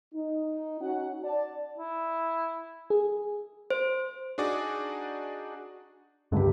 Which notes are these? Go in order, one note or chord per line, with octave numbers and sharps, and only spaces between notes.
D#4
C#4 D#4 F#4 C#5 F#5
D5 A5
E4
G#4
C5
D4 D#4 F#4 G#4 D5
C#2 G2 D3 G4